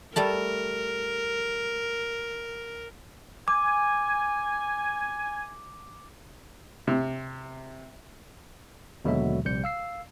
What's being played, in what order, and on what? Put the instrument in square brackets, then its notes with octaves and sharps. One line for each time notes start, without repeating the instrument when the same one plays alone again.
[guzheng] G3 A3 A5 [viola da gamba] A#4
[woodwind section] G#5 [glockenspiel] D6
[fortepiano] C3
[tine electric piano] D#2 B2 D3 F#3 G#3 E5
A#1 C3 G3 G6 C#7
F5 E6 C7